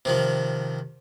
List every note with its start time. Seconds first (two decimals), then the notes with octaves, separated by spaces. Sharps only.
0.05 C3 D#3 F3